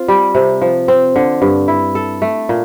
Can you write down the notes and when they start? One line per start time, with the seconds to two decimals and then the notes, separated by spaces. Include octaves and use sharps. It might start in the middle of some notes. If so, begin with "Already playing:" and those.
Already playing: C4 F4
0.08 G3
0.35 C3
0.62 F3
0.88 C4
1.16 D3
1.42 G2
1.68 E4
1.95 A4
2.22 A3
2.49 A#2